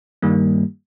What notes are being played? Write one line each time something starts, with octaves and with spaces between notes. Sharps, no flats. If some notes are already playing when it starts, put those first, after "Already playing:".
G2 D#3 G3 A#3